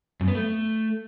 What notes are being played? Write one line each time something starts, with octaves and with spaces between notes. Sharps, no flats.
F#2
B3
A3